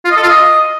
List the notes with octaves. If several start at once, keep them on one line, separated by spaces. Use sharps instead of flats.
F4
D#5
A4
F4
D#5